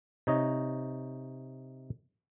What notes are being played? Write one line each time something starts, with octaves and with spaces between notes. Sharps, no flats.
C3 D#4 C#5 D#5